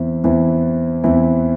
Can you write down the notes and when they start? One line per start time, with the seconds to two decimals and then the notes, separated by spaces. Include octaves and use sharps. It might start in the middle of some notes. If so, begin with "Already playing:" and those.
Already playing: E2 E3 C4 E4
0.24 E2 E3 C4 E4
1.04 E2 E3 C4 E4